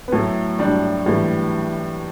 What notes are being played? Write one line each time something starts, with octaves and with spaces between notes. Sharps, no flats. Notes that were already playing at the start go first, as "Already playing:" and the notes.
B3
A2 F#3 A3
G3 D4
A2 E3 G3